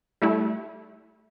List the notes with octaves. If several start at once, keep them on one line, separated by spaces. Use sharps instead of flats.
G3 A3 E4